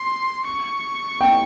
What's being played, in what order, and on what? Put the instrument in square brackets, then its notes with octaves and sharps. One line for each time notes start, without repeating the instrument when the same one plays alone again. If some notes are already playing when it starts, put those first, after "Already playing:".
Already playing: [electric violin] C6
C#6
[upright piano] G5